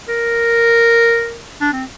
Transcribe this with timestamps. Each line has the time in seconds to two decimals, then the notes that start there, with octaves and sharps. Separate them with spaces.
0.08 A#4
1.61 D4
1.73 C4